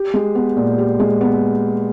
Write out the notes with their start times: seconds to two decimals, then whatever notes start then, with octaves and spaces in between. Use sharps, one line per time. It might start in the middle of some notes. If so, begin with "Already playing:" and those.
Already playing: G4
0.14 G#3
0.35 B3
0.57 A#2
0.78 G4
1.00 G#3
1.21 B3